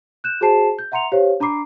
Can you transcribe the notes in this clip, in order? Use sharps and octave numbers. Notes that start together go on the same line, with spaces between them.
F#6 G6 E7
F#4 G#4 C5 A5 C7 E7
G6
E5 F#5 A#5 C6 C#7 F7
G4 C5 C#5 F5
D4 A#5 B5 D6 C7